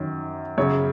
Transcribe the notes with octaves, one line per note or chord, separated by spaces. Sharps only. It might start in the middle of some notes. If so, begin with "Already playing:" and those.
Already playing: F#2 D#3
F#2 C#3 C#5